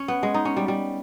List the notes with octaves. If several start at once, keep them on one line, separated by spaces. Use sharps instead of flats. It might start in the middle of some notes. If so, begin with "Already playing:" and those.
Already playing: C#4
B3
G#3
D#4
C#4
G3
G3